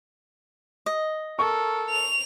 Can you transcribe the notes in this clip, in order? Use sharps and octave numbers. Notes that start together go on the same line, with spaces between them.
D#5
A4 A#4 C#6
F7